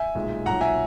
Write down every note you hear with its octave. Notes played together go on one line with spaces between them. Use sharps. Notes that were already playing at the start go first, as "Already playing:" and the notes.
Already playing: E5 G#5
B1 A#2 G#3
B1 A#2 F#3 F#5 A#5
E5 G#5